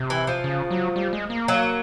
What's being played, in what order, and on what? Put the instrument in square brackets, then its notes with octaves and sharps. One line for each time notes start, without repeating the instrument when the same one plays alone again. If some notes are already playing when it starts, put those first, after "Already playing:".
Already playing: [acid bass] C3
[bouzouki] E3
F3
[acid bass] C#3
F#3
G3
G#3
A#3
[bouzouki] F#3